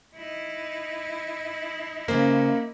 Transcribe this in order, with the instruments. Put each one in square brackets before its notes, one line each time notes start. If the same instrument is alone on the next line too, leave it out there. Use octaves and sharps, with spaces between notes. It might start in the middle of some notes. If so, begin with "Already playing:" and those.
[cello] D#4 E4
[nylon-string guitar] C#3 C5 [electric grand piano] A#3